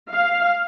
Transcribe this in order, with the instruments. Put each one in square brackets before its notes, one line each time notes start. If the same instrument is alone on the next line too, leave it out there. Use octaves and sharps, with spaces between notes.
[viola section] F5